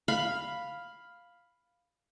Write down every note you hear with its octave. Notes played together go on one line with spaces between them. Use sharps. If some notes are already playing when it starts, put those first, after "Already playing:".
F5 B5